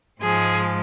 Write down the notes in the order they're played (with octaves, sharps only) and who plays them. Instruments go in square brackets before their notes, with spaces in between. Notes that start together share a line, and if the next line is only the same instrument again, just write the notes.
[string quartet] G#2 F3 G#3 G#4